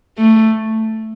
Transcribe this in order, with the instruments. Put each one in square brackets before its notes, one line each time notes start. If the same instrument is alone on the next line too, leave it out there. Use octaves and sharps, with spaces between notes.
[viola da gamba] A3